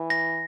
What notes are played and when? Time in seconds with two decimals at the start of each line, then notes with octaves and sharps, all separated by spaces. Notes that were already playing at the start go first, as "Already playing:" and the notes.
Already playing: E3
0.10 A#6